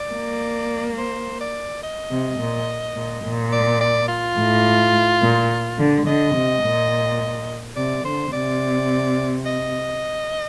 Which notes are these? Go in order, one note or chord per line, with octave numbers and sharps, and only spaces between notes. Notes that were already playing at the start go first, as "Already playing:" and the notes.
Already playing: D5
A#3
C5
D5
D#5
C3
A#2
A#2
A#2
D5
D5
F4
A2
A#2
D3
D3 D#5
C3
A#2
C3 D5
D3 C5
C3 D5
D#5